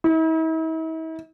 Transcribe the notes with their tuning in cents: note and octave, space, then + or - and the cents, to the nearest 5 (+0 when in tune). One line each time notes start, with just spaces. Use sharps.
E4 -45